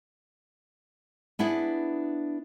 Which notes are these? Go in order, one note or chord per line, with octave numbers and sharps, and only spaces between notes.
B3 D4 E4 G#4 B4